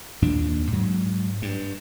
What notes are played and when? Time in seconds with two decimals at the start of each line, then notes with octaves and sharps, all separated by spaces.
0.22 D#2 A#2 D4
0.72 G#2 F#3
1.42 G2